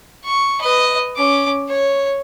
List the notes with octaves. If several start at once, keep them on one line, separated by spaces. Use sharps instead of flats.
C#6
B4 D#5
C#4 D6
C#5